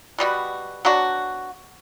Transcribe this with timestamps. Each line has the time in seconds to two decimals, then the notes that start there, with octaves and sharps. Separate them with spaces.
0.18 B2 G3 B3 F#4
0.85 F#3 B3 D4 F#4